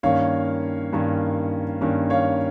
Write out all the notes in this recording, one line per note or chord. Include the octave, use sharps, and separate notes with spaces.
G2 D#3 A#3 C#4 C#5 F5
G2 D#3 A#3 C#4
G2 D#3 A#3 C#4
C#5 F5